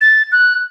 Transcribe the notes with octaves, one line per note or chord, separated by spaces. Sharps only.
A6
F#6